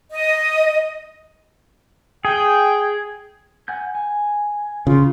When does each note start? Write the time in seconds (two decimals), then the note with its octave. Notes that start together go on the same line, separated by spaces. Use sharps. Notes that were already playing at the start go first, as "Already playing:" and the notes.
0.11 D#5
2.25 G#4 G5
3.68 F#5 G#5 G6
3.95 G#5
4.87 C#3 F4